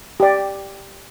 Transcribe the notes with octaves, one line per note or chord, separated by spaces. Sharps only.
G4 D5